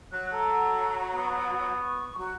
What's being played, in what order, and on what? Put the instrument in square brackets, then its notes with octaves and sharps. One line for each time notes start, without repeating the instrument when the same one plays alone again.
[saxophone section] F#3 [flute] F#6
[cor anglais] A4 [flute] A#5
[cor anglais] B3
[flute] C#6
[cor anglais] F#3 [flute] F#4